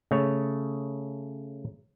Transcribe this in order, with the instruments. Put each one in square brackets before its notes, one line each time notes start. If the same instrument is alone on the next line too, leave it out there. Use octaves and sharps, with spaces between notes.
[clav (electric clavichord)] C#3 A3 C#5